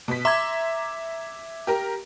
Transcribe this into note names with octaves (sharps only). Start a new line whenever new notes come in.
B2 B6
E5 A#5 C6 D6 G#6
G4 A#4 A#5